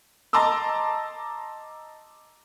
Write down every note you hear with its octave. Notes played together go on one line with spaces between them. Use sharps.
D#5 A5 A#5 C6 D6 E6